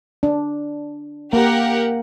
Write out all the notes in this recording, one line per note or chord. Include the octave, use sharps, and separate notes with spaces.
D4
A#3 G4 A#4 F#5